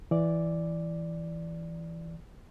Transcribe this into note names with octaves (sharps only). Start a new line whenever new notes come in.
E3 D5